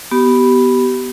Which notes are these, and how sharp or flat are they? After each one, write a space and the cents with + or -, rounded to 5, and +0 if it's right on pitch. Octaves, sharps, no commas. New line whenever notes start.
B3 +0 G4 -25